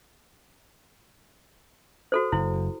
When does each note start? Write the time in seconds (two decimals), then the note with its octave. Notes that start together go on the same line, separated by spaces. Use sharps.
2.12 F#4 A4 C5
2.32 F#1 E4